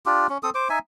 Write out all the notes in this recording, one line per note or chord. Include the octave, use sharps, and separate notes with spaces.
D4 F4 G4
C#4
C4 A4 D#6
C5 D6
D#4 E5 G#5